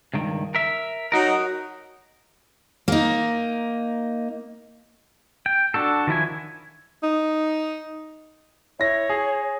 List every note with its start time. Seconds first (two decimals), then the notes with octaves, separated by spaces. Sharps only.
0.13 C#2 G2 D#3
0.55 A#4 E5
1.12 F#3 D#4 F#4 A#4
2.88 A#3 D#4
5.46 G5
5.74 D4 F#4 A4
6.07 D#3 F3 E4 G#5
7.03 D#4
8.80 E4 C#5 A#6
9.09 G#4